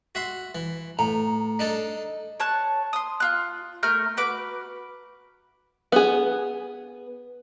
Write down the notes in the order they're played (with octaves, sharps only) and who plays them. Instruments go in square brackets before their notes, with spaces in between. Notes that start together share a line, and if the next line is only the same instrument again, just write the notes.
[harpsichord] F#4 E5 C6
E3
[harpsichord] A2 [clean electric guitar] A#5
[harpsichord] D4 D#4 A4
[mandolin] C#5 A5 F#6
C6 D#6
F4 F#6
A3 A#4 F6 G6
F#4 B4 D6
[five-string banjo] B3 G#4